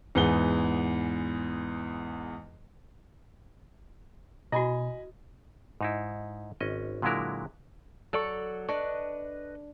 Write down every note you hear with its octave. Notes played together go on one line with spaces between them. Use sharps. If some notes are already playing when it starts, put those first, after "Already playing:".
E2 G#2 B3 G#5 G7
B2 E4 F#4 D#5 G#5 B5
G#2 D#4 E4
G#1 C#4 D#5
A#2 D3 F#3 G#3 E4 A#4
F#3 A4 D5 C#6
D4 B4 D#5 C#6